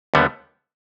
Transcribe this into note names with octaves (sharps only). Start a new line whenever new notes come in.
D#2 D3 G3 B3